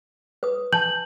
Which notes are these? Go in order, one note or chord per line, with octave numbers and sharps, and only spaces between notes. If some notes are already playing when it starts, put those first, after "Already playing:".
B4 D#6
G#5 A5 G6 F#7